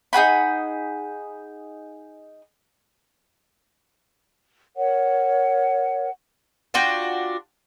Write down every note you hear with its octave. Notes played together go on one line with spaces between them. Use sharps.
D#4 G#4 F#5 B5
A#4 C#5 F#5
D4 F4 F#4 G5